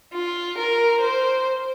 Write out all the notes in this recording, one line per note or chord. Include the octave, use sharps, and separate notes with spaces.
F4
A#4
C5